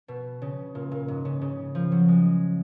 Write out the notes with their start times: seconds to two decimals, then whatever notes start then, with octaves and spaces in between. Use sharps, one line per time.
0.08 B2
0.42 C#3
0.75 A#2
0.91 A#2
1.08 G#2
1.25 C#3
1.41 C#3
1.75 F3
1.92 F#3
2.08 G#3